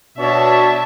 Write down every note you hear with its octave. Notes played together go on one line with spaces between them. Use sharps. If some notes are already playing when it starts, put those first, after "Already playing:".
B2 D4 C#5 E5 A5